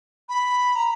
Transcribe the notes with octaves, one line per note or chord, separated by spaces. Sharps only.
B5
A#5